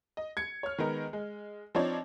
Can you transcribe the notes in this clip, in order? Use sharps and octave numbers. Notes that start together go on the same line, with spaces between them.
D#5
G#6 C#7
C#5 F6
D#3 G#3 B3 D#4 A#4
G#3
F3 C4 D4 D#4 C#5 D5